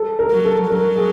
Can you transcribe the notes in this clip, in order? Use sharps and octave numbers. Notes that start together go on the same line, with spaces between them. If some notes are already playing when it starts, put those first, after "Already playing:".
Already playing: A4
A#4
F#3
A4
F#3 A#4
G#4